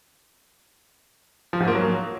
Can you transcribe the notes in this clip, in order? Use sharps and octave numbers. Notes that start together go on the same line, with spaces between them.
F3
G#2
A#3
F#3